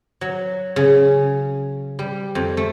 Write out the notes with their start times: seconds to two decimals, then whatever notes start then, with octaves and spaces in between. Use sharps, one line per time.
0.21 F#3
0.76 C#3
1.99 G3
2.35 F2
2.57 A3